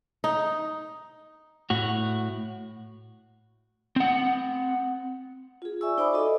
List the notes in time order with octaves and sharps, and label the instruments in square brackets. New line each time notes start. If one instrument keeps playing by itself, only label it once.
[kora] D#4
[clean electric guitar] A2 F#4
[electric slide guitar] C4 F#5
[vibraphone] F4 G#4
D5 E5 G#5 C#6 E6
D#4 C5 D5 G#5 B5 D6
F#4 A4 D#5